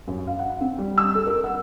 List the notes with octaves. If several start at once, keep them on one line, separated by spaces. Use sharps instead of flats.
F#2
F5
F#5
C4
G3
E6
A4
A#4
F#5